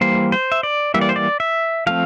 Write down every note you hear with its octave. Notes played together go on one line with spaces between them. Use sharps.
E3 G3 A#3 C5
C5
E5
D5
E3 G3 A#3 E5
D5
C5
D5
E5
F3 A3 C4 F5